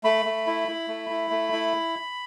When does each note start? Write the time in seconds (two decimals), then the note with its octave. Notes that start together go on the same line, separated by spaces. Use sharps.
0.04 A3 B5
0.26 A3
0.47 E4
0.68 E4
0.88 A3
1.10 E4
1.30 A3
1.53 E4